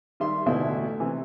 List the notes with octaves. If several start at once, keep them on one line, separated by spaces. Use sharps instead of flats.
D#3 G3 E5 C6
A1 D2 B2 E4 E5
C3 E3